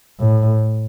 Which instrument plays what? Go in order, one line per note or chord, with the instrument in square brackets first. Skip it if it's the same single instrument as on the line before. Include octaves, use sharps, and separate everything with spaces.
[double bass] A2